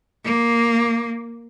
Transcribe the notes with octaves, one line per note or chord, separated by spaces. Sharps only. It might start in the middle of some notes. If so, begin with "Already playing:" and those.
A#3